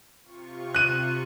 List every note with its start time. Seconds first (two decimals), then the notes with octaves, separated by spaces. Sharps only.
0.21 C3 F4 C#6
0.74 F#6 D#7